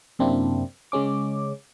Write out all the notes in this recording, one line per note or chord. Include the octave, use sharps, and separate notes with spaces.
F#2 C3 A#3 C4 D4 E4
C#3 G#3 C#4 D6